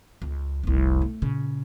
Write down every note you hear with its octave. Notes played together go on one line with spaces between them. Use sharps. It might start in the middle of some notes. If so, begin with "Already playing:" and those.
C#2
F1 C2
A3
A#2 C#3